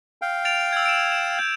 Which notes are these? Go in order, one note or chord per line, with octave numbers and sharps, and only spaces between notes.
F5 G5
A6 D7 F7
E6 G#6
D7 E7
E7
G6